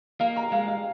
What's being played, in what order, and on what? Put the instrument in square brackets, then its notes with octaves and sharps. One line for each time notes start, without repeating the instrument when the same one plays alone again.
[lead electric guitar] A#3 [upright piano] F5
[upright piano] A#5
[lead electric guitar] G#3 [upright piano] F5
[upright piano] F5